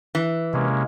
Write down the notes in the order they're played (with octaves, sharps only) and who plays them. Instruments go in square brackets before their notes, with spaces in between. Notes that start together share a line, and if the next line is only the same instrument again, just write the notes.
[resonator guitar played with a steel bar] E3
[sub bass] C3 [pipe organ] G#3 A#3 C#4